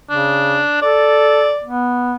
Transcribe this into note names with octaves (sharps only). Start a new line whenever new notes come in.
C#3 D4
A4 D5
B3